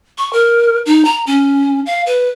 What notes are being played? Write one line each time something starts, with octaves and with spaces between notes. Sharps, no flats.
C#6
A#4
D#4
A#5
C#4
F5
B4